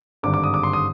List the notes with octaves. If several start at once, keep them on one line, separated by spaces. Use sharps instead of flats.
G#1 G2 D3 D6
D6
D#6
D6
C6
D#6